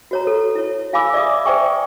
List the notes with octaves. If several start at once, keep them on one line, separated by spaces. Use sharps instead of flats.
F#4 C#5 A#5
A4
E4 C#5
E4 F5 G#5 B5 D6 E6
D5 E5 D6 D#6
C5 D5 E5 G5 G#5 C#6